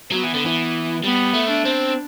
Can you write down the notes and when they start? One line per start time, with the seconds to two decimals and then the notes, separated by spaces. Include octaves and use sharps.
0.11 F#3 B3
0.23 E3
0.34 D3
0.46 E3
1.04 G3 B3
1.34 A3
1.50 D4
1.65 C4